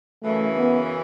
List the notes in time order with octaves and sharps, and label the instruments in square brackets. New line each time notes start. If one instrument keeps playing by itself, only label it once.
[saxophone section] F#2 C#3 E3 [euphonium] A3
[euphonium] B3